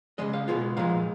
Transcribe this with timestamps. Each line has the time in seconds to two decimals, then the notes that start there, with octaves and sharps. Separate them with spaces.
0.18 C#3 F3 G#3 D#5
0.33 F5
0.48 B2 G#3 B3 F4
0.77 A#2 F3 G#3 F5